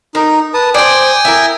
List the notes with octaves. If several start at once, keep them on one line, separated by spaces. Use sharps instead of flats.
D#4 A#4
B4 A5 D#6
C5 D5 G5 G#5 D#6
E4 A#4